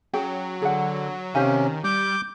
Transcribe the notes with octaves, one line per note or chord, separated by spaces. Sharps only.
F#3 C#4 G#4 G5
D3 G#4 F#5
C3 D#3 C#4 G4 F5 G#5
G3 D6 G6